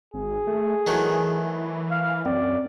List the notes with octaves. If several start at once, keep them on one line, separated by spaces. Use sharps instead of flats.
G#1 G#4
A3
D#3 E3 F#3 A3
F5
F#2 C4 D5